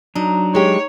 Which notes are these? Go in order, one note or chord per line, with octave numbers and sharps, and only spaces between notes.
F#3 D4 D#4
G#3 G4 C#5